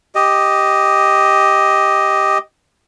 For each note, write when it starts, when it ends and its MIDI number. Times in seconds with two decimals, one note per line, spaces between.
0.15 2.38 67
0.15 2.38 75